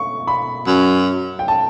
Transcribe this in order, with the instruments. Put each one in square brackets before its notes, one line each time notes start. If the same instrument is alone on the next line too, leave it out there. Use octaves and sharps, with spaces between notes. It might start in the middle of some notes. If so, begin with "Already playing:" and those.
Already playing: [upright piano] C#6
B5
[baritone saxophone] F#2
[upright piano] G5
A5